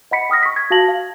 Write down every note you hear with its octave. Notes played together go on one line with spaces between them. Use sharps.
D#5 F#5 B5 B6 C#7
G5 D#6 F6 A#6
C#6 B6
G#6
F#4 F5 A5 A#6 F#7
F5